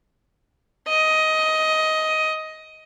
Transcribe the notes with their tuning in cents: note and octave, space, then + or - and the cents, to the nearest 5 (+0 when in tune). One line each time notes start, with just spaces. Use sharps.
D#5 +15